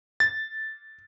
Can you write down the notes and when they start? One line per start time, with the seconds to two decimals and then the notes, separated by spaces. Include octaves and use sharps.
0.20 A6